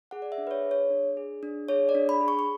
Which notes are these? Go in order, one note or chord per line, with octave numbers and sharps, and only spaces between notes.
G#4 F#5
D5
E5
D4
B4
C#5
G#4
C#5
D4
G#4
D4
G#4 C#5
D5
D4
B5
G#4
C#6
C#6